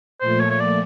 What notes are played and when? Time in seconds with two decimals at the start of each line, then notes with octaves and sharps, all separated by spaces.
0.21 A#2 F3 A3 C5
0.40 C#5
0.50 C#5
0.60 D5